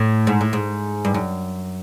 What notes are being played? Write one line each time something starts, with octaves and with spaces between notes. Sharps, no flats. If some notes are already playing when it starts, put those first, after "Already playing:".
Already playing: A2
G#2
A2
G#2
G2
F#2